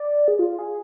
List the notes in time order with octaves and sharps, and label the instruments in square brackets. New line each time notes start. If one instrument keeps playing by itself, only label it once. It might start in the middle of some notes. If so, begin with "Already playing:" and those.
Already playing: [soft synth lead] D5
G#4
F4
G#4